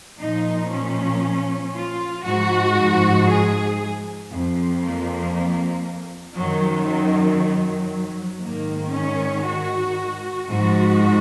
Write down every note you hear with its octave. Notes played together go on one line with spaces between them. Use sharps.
A#2 F3 D#4
C#4
F4
G#2 F3 F#4
G#4
F2 F3
A#3
F#2 D#3 F#3
F#3
F#3
G#2 D#3 A#3
C#4
F#4
G#2 F3 F#4